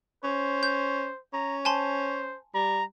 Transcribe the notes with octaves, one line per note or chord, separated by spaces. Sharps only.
C#4 C5
G6
C#4 A#5
C5 G#5 A5 C6
G3 A#5